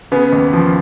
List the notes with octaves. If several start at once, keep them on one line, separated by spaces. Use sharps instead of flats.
C#3 B3
D#2
F3